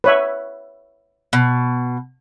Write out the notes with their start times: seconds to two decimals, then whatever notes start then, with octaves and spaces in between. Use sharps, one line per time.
0.04 B4 C#5 E5
1.33 B2